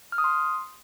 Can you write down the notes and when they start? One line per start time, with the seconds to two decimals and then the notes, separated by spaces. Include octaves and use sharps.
0.12 F6
0.18 D#6
0.24 C6